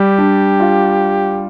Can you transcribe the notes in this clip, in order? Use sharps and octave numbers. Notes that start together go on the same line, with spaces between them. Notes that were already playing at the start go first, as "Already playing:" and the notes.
Already playing: G3 G4
D4
F4